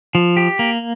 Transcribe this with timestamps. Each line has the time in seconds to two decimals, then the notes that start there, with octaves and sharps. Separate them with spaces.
0.15 F3
0.37 G4
0.59 A#3